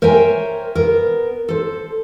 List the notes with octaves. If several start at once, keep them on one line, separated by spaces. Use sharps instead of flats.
A#4 C5 C#5 E5 G5 G#5
B3 A#4
A4 C5